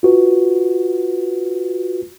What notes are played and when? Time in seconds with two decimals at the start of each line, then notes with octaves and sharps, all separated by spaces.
0.03 F4 F#4 B4